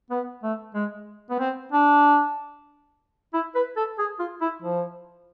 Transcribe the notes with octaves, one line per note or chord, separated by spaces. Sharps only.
B3
A3
G#3
B3
C4
D4
E4
B4
A4
G#4
F4
E4
F3